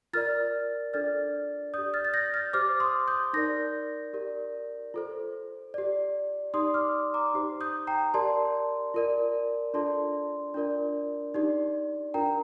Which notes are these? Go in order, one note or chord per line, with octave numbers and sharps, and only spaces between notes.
F4 A#4 D5 F6 A6
D4 A4 D5 F6 A6
G4 D5 D#6 G6
F6 A6
A6
G6 A#6
F6 A6
G4 C5 D6 F6
C6 D#6
D#6 G6
D#4 A#4 D5 G6 A#6
G4 A#4 D5
F4 A4 C5
G4 D5
D#4 G4 D5 C6 D#6
D6 F6
A#5 D6
D#4 G4 C5
D#6 G6
G5 A#5
G4 A#4 D5 A5 C6
F4 A#4 D5
D4 F4 A4 D5 A5 C6
D4 F4 A#4 D5
D#4 G4 D5
D4 F4 A#4 G5 A#5